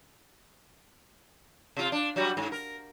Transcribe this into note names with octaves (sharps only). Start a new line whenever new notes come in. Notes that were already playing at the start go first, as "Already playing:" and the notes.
C3 F4
D4
F#3 G3 F#4
G#2
A#4